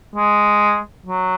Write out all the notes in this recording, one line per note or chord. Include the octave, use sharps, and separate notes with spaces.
G#3
F#3